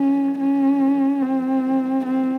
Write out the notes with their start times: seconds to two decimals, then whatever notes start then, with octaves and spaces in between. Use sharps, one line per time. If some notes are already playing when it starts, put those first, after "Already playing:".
Already playing: C#4
0.39 C#4
1.22 C4
2.05 C4